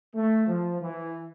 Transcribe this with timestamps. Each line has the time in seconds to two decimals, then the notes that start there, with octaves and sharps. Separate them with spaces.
0.14 A3
0.47 F3
0.80 E3